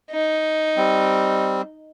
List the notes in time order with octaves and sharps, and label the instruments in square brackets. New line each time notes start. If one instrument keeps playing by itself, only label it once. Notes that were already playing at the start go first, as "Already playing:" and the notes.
[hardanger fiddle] D#4
[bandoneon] G3 C4